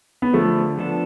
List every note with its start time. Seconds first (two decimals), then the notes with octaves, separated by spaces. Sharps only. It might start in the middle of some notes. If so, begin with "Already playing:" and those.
0.22 B3
0.33 D3 F3 A3
0.79 F3 B3 D4 A4